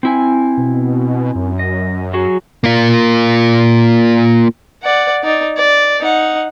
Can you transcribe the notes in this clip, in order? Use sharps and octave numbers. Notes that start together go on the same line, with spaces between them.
C4 E4 G#5
B2
F#2
D#5
F#3 F#4 G#4
A#3 F4
D5 F#5
D#4 D5
D5
D#4 F#5